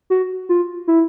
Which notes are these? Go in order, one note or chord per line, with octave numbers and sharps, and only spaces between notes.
F#4
F4
E4